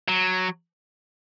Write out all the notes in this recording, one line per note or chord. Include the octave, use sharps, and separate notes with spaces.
F#3